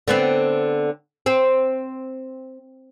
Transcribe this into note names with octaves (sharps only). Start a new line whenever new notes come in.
D3 B3 C4
C4